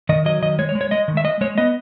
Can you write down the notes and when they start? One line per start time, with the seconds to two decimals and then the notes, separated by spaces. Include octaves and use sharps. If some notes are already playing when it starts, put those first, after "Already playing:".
0.09 D#3 D#5
0.25 F#3 D#5
0.42 D#3 D#5
0.59 G#3 C#5
0.69 C#5
0.75 G#3
0.81 C#5
0.91 G#3 D#5
1.08 D#3
1.17 E5
1.24 G#3 D#5
1.41 G#3 C#5
1.58 B3 D#5